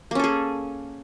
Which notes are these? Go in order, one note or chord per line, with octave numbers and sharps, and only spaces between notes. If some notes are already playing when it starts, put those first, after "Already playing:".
A#3 C#4 G#4 A4